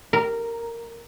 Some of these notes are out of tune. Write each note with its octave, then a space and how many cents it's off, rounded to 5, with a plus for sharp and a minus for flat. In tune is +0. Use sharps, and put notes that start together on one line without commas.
A#4 -10